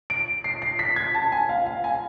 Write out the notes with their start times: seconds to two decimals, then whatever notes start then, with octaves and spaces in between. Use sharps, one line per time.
0.10 D7
0.44 C7
0.62 C7
0.79 B6
0.96 G#6
1.15 A5
1.32 G#5
1.49 F5
1.66 F5
1.84 G#5